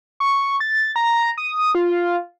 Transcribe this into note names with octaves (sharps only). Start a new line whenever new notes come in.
C#6
A6
A#5
D#6
F4